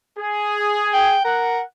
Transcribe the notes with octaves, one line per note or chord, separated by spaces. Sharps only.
G#4
G5
A#4 F#5